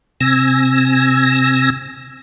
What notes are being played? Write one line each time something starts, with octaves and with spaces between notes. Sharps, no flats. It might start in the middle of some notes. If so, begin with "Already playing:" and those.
C3 G#5 E6 A#6